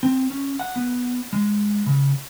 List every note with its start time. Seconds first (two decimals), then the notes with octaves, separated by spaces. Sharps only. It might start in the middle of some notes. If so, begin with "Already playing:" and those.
0.03 C4
0.30 C#4
0.59 F#5
0.76 B3
1.33 G#3
1.86 C#3